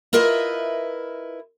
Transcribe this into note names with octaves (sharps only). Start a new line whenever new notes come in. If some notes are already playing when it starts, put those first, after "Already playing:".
E4 F4 A#4 B4 D#5 E5